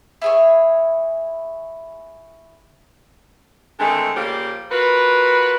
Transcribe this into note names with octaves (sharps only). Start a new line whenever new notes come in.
E4 G#4 C#5
D3 D#3 G#3 A3 C4
C#3 F3 G3 A#3
F4 F#4 A#4 B4